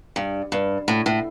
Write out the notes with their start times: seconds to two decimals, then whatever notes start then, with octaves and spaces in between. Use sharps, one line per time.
0.16 G2
0.52 G2
0.88 A2
1.06 A2